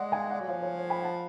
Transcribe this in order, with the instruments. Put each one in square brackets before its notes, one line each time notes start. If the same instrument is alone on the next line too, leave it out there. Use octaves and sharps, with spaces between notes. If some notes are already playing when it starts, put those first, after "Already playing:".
Already playing: [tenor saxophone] G#3 [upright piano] D5 F#5
[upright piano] F5 G#5
D5 F#5
[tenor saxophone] F#3
[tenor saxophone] F3 [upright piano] C#5 F5
[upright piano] C#5
G#5 B5
F#5 A5